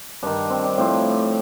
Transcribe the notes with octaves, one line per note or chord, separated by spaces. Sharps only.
G2 D#3 D4
C4
D4
A2 F3 C4